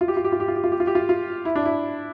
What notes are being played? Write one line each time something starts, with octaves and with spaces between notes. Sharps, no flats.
F4
G4
F4
G4
F4
G4
F4
G4
F4
G4
F4
G4
F4
F4
E4
D4
E4